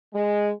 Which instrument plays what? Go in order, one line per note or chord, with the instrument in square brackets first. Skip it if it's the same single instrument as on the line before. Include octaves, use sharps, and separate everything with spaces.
[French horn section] G#3